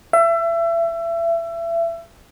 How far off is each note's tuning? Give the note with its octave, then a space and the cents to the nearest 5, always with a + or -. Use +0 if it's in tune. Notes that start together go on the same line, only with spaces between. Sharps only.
E5 +30